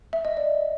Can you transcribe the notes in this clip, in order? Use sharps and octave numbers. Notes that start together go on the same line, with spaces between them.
E5
D#5
D5